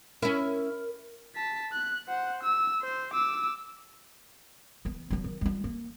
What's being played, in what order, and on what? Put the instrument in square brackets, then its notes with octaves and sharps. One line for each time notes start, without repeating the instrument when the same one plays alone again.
[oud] C#4 E4 [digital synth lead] A#4
[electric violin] A5 B6
F#6
C5 F#5
E6
C5
D6 E6
[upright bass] E3 B3
F#3 B3
D#3
G3 F4
A#3